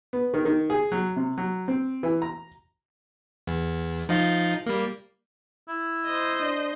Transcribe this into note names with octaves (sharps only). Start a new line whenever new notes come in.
B3
D#3
D#3
G#4
F#3
C3
F#3
C4
E3
A#5
E2
F3 D#4 F4
G3 A#3
E4
C5 D#5
D4